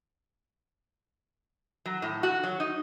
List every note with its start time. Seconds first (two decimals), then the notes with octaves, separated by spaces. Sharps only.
1.86 F#3
2.02 A2
2.23 F#4
2.44 F#3
2.60 D#4